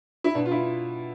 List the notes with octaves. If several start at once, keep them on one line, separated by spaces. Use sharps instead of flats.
E4
B2 D4
F4
E4